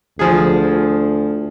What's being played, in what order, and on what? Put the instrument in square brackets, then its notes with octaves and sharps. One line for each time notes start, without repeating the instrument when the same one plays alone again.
[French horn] D2 [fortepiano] F3 G#4